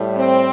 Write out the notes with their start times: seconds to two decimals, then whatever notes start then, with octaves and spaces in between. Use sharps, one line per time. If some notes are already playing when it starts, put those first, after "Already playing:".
Already playing: A2 G3
0.16 C4